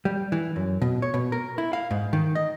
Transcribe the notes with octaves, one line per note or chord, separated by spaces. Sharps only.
G3
E3
F#2
B2
C#5
B2
A#4
E4
F5
G#2
D#3
D#5